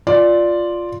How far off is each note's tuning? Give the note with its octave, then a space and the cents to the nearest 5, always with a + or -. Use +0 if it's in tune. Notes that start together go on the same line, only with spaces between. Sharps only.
F4 +0 D5 +0